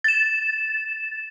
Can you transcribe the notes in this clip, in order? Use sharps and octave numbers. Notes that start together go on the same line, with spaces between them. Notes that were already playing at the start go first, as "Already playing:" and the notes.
A6 E7